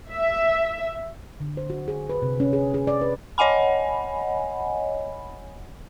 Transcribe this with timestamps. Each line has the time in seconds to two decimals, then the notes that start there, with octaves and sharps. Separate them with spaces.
0.11 E5
1.40 D3
1.57 C5
1.70 F#4
1.88 G#4
2.09 B4
2.22 C3
2.40 C#4
2.53 G#4
2.74 G#4
2.87 D5
3.01 B4
3.38 C#5 D#5 F#5 G#5 B5